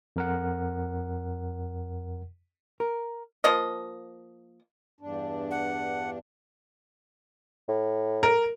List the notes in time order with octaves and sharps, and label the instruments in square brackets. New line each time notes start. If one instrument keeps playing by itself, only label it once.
[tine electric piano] F2 A#4 F#5
[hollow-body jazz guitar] A#4
[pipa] F3 A#3 D#5
[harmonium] E2 G2 D4
[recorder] F#5
[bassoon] A2
[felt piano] A#4